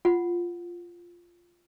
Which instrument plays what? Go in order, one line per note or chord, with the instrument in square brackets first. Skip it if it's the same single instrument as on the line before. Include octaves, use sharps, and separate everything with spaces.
[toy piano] F4 F#5